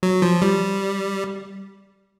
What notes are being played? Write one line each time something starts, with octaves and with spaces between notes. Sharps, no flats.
F#3
F3
G3